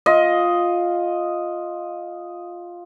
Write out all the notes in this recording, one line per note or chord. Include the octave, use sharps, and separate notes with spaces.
F4 D#5